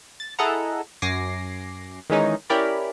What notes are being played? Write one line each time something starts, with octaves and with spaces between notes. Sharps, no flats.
A6
E4 G#4 A4 D#5 F#5 A#5
F#2 G#5 D6 A#6 C7
D#3 E3 G#3 C#4 D#4
C#4 E4 G4 A#4 D5 B5